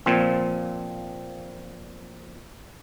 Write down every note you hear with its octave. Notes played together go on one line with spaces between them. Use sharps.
A#2 F3 C4